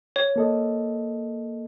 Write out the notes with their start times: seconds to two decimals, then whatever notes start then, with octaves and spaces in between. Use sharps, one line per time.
0.16 C#5
0.36 A#3 A4 D#5